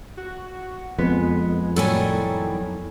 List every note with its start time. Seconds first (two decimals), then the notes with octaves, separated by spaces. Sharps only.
0.17 F#4
0.98 F2 G#3 B3
1.76 A2 D#3 F#3 G3 A4 C#5 G#5